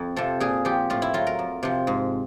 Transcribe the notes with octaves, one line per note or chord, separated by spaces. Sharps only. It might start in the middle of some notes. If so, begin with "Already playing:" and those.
Already playing: F2
C3 F3 A4
A#2 G#4
F3 G4
A2 F4
E4
F#3 F4
A#4
F2
C3 F3
G#2